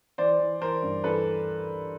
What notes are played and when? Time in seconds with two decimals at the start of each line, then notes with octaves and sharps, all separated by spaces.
0.18 E3 C5 D5
0.40 E3
0.61 E3 A#4 C5
0.82 G2
1.04 E3 A4 B4